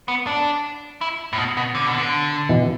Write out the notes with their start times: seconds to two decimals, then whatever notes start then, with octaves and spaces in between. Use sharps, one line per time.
0.08 B3
0.27 D4
1.01 E4
1.33 A2
1.37 B2
1.57 B2
1.75 D3
1.86 B2
1.98 D3
2.49 B2 E3